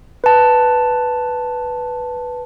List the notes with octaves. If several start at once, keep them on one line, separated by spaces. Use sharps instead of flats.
B4 A5